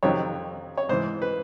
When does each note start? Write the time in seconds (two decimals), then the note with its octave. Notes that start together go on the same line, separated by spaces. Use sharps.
0.03 F2 C3 D#3 F#3 C#5
0.77 C#5
0.89 G#2 E3 C5
1.22 B4